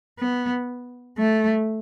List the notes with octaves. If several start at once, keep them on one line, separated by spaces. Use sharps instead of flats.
B3
A3